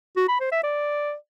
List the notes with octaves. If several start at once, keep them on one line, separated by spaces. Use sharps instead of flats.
F#4
B5
C5
E5
D5